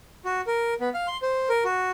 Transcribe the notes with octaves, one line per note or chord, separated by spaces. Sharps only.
F#4
A#4
B3
F5
C6
C5
A#4
F#4